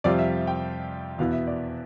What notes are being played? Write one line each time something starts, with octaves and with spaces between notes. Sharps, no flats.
F2 C3 G3 C4 F4 D5
E5
G5
E2 B2 B3 E4 F5
E5
D5